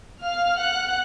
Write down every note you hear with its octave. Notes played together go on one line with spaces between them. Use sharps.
F5 F6
F#5 F#6